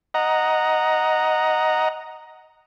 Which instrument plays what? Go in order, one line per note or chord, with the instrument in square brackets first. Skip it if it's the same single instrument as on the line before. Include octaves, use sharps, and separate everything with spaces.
[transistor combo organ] D#5 F#5 A#5